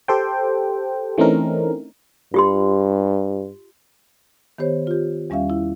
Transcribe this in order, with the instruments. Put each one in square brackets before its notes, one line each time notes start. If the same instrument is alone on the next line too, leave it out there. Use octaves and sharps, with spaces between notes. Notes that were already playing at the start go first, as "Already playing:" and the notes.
[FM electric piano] G4 A4 C5 G5
E3 A3 C4 C#4 D#4 A#4
[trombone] G2 [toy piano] F4 G4 C6
[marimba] D#3 B3 G4 C5 C#5
F4 G4
E2 G3 C#4 E5 F5
E4